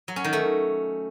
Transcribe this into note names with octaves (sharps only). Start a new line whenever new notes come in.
F#3
C#4
D#3
A3